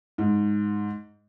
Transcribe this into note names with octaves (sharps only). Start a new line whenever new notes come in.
G#2